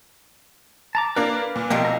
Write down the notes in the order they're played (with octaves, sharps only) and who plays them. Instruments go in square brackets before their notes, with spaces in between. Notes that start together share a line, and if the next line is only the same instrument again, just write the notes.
[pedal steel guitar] A5 A#5 D6
[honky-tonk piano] A#3 D4 A#4 [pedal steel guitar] B4 F5
[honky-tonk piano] A#2
[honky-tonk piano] C2 [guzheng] B2 F3 G4 [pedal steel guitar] A#3
[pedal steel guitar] A#4 E5